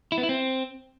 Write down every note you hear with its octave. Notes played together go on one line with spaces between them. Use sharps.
E4
B3
E4
C4